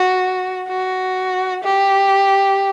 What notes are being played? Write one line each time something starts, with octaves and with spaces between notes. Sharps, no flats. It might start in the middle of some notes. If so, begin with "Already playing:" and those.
Already playing: F#4
F#4
G4